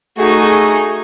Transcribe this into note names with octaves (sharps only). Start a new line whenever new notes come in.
A3 D#4 F#4 G#4